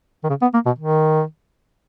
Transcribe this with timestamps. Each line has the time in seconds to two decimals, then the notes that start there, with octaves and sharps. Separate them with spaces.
0.24 D#3
0.29 C#3
0.41 B3
0.54 A#3
0.66 B2
0.79 D#3